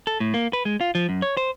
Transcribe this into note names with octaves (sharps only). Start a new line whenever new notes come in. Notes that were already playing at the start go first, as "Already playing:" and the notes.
A4
A2
A#3
B4
G#3
F4
F3
F#2
C#5
C5